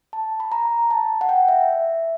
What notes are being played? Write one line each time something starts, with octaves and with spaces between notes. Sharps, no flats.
A5
B5
A#5
A5
F#5
G5
E5